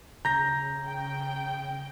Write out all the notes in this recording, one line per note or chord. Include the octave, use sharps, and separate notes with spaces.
C#3 A#5 G6 A#6
G5